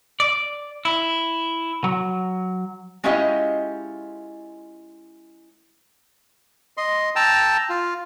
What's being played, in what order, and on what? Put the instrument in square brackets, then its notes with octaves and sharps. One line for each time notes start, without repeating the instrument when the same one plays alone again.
[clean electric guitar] D5
E4
F#3
[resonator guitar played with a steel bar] G#3 C#4 E4 F4 G4 D#5
[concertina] D#5 C6
G5 A5 A#5 E6
F4